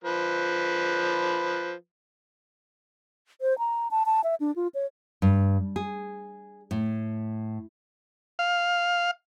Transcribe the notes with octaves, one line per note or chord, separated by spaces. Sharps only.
F3 B4
C5
A#5
A5
A5
E5
D4
F4
C#5
G2
G#4
A2
F5